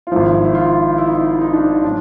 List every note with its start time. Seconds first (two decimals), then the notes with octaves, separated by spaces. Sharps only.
0.07 F4
0.12 G#1 G#2 F3 E4
0.45 E4
0.55 F4
0.98 E4
1.07 D#4
1.15 E4
1.41 D#4
1.53 D4
1.65 D#4
1.84 A2 F#3 D4